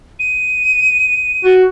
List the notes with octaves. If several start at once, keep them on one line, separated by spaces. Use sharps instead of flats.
D#7
F#4